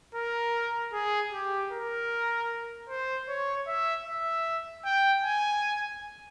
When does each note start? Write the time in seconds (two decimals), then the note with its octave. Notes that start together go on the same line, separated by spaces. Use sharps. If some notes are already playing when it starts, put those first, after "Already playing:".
0.15 A#4
0.93 G#4
1.32 G4
1.71 A#4
2.89 C5
3.28 C#5
3.67 E5
4.06 E5
4.85 G5
5.24 G#5